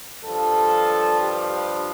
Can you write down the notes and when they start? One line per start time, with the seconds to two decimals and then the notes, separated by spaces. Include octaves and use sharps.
0.23 G2 F3 A4
1.19 G4